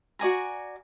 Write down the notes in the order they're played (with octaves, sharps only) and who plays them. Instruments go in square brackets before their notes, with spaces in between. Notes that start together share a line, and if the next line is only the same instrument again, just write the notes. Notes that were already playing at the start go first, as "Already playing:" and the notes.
[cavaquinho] F#4 D5 G#5 A#5